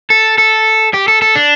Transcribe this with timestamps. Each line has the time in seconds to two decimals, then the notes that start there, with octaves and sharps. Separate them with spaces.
0.10 A4
0.38 A4
0.94 G4
1.08 A4
1.22 A4
1.35 D4